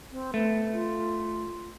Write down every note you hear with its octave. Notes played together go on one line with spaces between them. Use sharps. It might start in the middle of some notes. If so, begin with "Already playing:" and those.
C4
A3 B3
F4